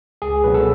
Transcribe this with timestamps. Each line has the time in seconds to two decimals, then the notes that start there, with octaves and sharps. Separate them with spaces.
0.22 C#2 G#4
0.44 B2 F#3 B3 B4
0.54 A4